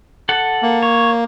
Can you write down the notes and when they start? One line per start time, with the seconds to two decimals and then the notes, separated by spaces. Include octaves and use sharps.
0.29 A4 F#5
0.62 A#3
0.83 C#5